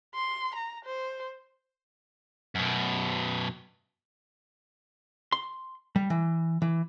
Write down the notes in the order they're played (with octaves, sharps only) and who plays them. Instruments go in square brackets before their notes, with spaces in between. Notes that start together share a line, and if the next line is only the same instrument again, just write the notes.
[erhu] C6
A#5
C5
[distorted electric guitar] F#2 B2
[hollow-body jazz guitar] C6
G3
E3
E3